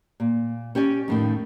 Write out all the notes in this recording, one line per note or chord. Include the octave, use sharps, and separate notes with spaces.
A#2
C#4 G4 D5 G#5
F2 A2 D#3